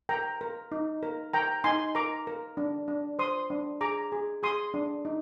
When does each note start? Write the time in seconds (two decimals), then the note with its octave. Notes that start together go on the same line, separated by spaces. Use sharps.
0.09 A#4 G5 A#5
0.41 A#4
0.72 D#4
1.03 A#4
1.33 A#4 G5 A#5
1.64 D#4 G#5 C6
1.95 A#4 A#5 D6
2.27 A#4
2.57 D4
2.88 D4
3.19 C5 C6 D#6
3.50 D4
3.81 G#4 A#5 D6
4.12 G#4
4.43 G#4 C6 D#6
4.74 D4
5.05 D#4